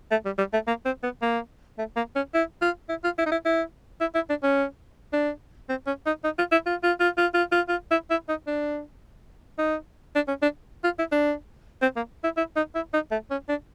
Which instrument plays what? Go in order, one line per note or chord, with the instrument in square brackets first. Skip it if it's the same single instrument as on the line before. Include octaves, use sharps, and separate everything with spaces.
[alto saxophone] A3
G3
G3
A3
A#3
C4
B3
A#3
A3
A#3
C#4
E4
F4
E4
F4
E4
D#4
E4
E4
E4
E4
D4
C#4
D4
C4
C#4
D#4
D#4
F4
E4
F4
F4
F4
F4
F4
F4
F4
E4
E4
D#4
D4
D#4
D4
C#4
D4
F4
E4
D4
C4
A#3
E4
E4
D#4
E4
D#4
A3
C#4
D4